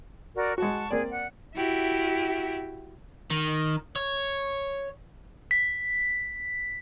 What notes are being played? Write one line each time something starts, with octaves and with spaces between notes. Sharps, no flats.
F#4 A#4 D5
G#3 F#4 F#5 A5 C#6
A#3 C4 G#4 D5
F#5
E4 F#4 G4 E5
D#3
C#5
B6